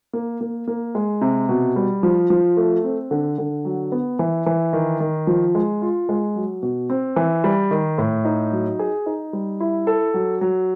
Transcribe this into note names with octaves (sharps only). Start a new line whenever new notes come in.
A#3
A#3
A#3
G#3
C3
B2
G3
F3
F3
A3
C4
D3
D3
F#3
B3
E3
E3
D#3
D#3
F3
G#3
F4
G#3
F#3
B2
C4
E3
G3
D#3
A2
D#4
F#3
G#4
D#4
G3
E4
A4
F#3
F#3